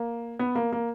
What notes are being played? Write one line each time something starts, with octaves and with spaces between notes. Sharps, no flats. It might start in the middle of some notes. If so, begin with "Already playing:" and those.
Already playing: A#3
B3
A#3
A#3